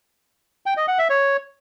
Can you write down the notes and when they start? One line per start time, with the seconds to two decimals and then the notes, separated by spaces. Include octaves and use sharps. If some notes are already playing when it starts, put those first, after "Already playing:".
0.66 G5
0.77 D#5
0.88 F#5
0.99 E5
1.10 C#5